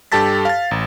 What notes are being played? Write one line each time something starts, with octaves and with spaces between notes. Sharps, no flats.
G2 G4 A4 A5 A6 B6
F5 A6
A1